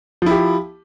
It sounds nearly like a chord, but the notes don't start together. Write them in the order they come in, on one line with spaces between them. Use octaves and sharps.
F3 E4 G4